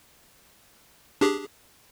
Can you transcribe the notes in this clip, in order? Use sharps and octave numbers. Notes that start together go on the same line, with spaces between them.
D4 G4 G#4